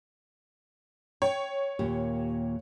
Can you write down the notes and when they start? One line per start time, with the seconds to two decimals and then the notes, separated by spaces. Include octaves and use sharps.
1.22 C#5 G5
1.79 D#2 A#2 G4